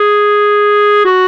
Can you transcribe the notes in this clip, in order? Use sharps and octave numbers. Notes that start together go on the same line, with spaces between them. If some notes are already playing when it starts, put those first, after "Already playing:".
Already playing: G#4
F#4